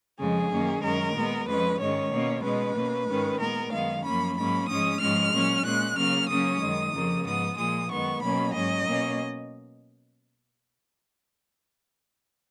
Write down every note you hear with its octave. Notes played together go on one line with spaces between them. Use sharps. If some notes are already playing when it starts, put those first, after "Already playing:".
F2 C#3 F3 G#3 G#4
F#2 D#3 A#3 C#4
F#2 D#3 G#3 C#4 A#4
A#2 G#3 B3
F2 F3 G#3 C#4 B4
G#2 D#3 G#3 C#4 C#5
B2 A#3 C#4
B2 G#3 C#4 B4
B2 A#3 C#4
G#2 D#3 G#3 C#4
A#2 G#3 B3 A#4
F#2 D#3 G#3 B3 F5
F#2 F3 A#3 C#4 B5
G#2 F#3 A#3 C#4 B5
G#2 F3 G#3 C#4 D#6
G#2 F3 G#3 C#4 F6
A#2 F#3 C#4
A#2 G#3 C#4 F#6
C#3 F#3 A#3 C#4 F6
C#3 F#3 A#3 C#4 D#6
F#2 D#3 G#3
F2 C#3 F3 A#3
G#2 F3 B3 D#6
A#2 F3 G#3 D#6
F#2 D#3 G#3 B3 C#6
B2 F#3 A#3 C#4 B5
G#2 F#3 C#4 D#5
B2 A#3 C#4